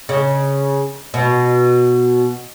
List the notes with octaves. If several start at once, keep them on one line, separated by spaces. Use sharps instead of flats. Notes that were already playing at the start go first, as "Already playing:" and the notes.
C#3
B2